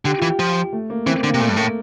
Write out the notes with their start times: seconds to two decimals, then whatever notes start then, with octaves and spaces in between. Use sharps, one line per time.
0.05 D3 G4
0.18 E3 F4
0.29 G4
0.39 F3
0.73 A3
0.90 A#3
1.06 E3 C4
1.17 A#3
1.24 D3
1.29 A#3
1.34 C3
1.40 A#2 A3
1.49 G2
1.56 A2 A#3